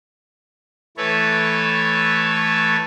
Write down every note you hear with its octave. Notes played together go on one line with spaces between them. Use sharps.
E3 A3 A4 B4 C#5